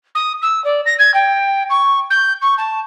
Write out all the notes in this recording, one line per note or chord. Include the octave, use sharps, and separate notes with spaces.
D#6
E6
D5
A#6
G#6
G5
C#6
G6
C#6
A5